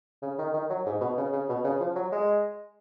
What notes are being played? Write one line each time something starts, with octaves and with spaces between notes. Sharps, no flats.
C#3
D#3
D#3
F#3
G#2
B2
C#3
C#3
B2
C#3
F3
F#3
G#3